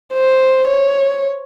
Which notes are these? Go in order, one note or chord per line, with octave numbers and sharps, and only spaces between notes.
C5
C#5